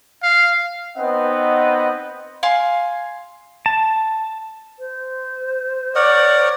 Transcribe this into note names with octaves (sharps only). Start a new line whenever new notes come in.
F5
B3 C4 D#4 B4 D#5 F#5
F5 G#5 C6
A5
C5
A#4 C#5 D5 F#5